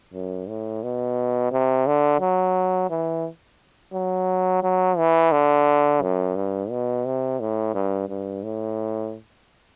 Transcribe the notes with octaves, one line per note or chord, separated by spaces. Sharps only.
F#2
A2
B2
C3
D3
F#3
E3
F#3
F#3
E3
D3
F#2
G2
B2
C3
A2
G2
G2
A2